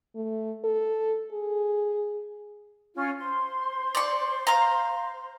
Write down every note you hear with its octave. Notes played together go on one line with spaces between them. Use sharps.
A3
A4
G#4
C#4 F4 F6
C5 C6
D5 C#6
F5 A#5